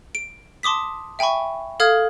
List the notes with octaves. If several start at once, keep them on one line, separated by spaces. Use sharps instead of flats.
D7
A5 C6 D6 D#6 B6
E5 G5 G#5 B5 C#6
A4 F5 D#6 F6 G#6